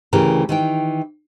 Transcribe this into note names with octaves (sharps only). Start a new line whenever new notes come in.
D2 C#3 E3 G4 A#4
D#3 E3 G5